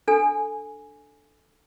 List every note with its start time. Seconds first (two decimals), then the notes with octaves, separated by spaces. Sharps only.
0.08 D4 A4 G#5